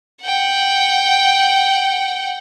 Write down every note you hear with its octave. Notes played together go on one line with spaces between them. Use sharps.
F#5 G5